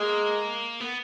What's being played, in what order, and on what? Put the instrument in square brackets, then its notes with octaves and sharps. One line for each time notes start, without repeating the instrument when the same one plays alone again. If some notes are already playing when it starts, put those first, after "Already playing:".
Already playing: [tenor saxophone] G#3 [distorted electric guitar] A#3
[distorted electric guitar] B3